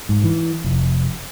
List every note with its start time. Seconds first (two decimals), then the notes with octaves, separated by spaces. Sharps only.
0.09 G#2
0.24 E3
0.64 F1